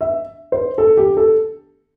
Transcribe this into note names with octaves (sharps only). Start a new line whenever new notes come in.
E5
C5
A4
G4
A4